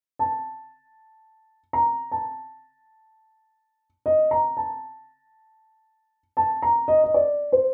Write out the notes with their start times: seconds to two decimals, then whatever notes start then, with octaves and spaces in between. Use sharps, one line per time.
0.19 A5
1.73 A#5
2.12 A5
4.06 D#5
4.31 A#5
4.57 A5
6.37 A5
6.63 A#5
6.88 D#5
7.04 D#5
7.14 D5
7.52 C5